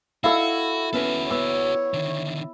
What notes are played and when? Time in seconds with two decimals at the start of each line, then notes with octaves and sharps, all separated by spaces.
0.24 D#4 E4 F#4 A4 F5 E6
0.93 B3 C#4 F#4 A4 B4
1.31 B3 C#5 E6
1.94 D3 D#3